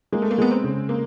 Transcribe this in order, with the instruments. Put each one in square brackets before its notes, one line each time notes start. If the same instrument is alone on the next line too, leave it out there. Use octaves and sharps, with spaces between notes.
[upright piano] G#3 [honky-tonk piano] A#3
[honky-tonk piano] A3
A#3
[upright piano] G#3 [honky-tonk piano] B3
[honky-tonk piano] C4
[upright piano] C#3
[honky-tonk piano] A#3